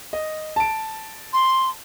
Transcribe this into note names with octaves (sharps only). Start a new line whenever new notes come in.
D#5
A5 D7
C6